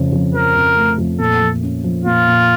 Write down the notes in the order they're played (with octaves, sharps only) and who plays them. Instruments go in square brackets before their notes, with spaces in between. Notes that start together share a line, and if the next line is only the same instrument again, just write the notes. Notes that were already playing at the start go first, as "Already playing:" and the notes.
Already playing: [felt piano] F2 C#3 A3
F2
[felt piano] F3 [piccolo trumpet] A#4
[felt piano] F2
A3
F2
[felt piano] A#2 [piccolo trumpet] A4
[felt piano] F3
C#4
F3
[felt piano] A#2 [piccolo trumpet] F4
[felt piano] A#2